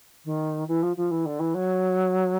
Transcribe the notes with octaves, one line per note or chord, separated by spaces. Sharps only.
D#3
E3
F3
F3
E3
D3
E3
F#3